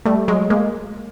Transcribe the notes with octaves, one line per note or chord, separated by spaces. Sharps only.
G3 A3
F#3 G#3
G#3 A#3